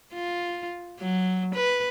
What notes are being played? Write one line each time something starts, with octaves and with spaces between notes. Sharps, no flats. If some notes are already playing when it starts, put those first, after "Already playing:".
F4
F#3
B4